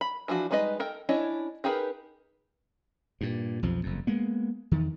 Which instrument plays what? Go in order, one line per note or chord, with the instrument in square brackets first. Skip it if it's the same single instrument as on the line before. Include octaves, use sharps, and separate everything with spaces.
[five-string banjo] B5
E3 F3 D4 F#4
G3 G#3 D#4 B4 D#5
A4 A#4 G5
C#4 D4 E4 C#5 D#5
D#4 G4 G#4 A#4 B4
[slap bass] G2 A#2
B1 F2 F3
F#1 F2
G#3 A#3 B3
E2 D#3